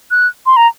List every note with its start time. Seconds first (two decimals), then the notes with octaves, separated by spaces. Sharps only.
0.11 F#6
0.46 C6
0.56 A#5